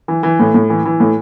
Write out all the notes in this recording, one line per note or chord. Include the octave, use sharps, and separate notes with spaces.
E3
E3
A2
A2
E3
E3
A2